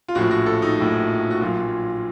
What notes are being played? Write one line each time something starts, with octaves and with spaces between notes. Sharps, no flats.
F4
A#1 A2 F3 F#4
F#4
A4
D#4
A#1 A2 F3
F#4
A#1 A#2 F#3 F4